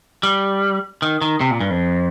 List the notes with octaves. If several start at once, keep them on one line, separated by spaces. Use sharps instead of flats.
G3
D#3
D#3
C3
A#2
G2
F2